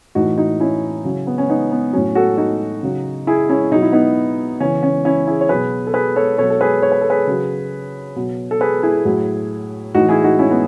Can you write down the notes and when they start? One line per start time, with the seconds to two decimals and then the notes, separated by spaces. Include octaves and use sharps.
0.15 A2 E3 D#4 F#4
0.38 D#4 F#4
0.60 C#4 E4
1.05 C#3 F#3
1.27 B3
1.38 C#4
1.49 B3 D#4
1.72 B3
1.93 A2 F#3 C#4
2.15 F#4 A4
2.37 D#4 F#4
2.83 C#3 F#3
3.27 E4 G#4
3.49 C#4 E4
3.71 B2 F#3 D#4
3.82 E4
3.92 B3 D#4
4.60 C#3 E3 C#4
4.83 C#4
5.05 C#4 E4
5.27 E4 G#4
5.41 C#5
5.49 B2 F#3 G#4 B4
5.87 A4
5.93 G#4 B4
6.16 A4 C#5
6.38 B2 F#3 A4 C#5
6.50 A4
6.61 G#4 B4
6.82 C#5
6.92 B4
7.01 A4
7.10 G#4 B4
7.27 C#3 F#3
8.16 B2 F#3
8.51 A4
8.61 G#4 B4
8.83 E4 G#4
9.05 A2 F#3
9.95 A2 E3 D#4 F#4
10.08 E4 G#4
10.24 D#4 F#4
10.39 C#4 E4
10.51 B3